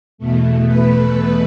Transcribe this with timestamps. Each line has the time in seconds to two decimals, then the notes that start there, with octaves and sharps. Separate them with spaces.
0.18 E2 B2 A3
0.66 B4